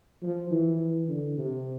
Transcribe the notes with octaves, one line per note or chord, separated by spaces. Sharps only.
F3
E3
D3
C3